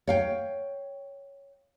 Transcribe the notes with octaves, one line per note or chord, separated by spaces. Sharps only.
C#5 F5 G5